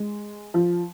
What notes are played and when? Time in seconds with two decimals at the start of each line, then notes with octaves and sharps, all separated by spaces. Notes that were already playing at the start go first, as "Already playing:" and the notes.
Already playing: G#3
0.54 F3